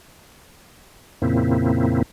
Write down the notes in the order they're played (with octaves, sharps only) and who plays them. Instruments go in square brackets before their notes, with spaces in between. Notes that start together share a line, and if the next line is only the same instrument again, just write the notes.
[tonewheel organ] F2 A#2 C#3 A#3 C4 E4